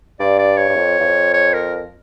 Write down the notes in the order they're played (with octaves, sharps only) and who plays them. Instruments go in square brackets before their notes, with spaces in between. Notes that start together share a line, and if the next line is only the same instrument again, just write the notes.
[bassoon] G2 [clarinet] D5
[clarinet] D5
C#5
[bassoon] G2
F2
E2
F2
[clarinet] C#5
A#4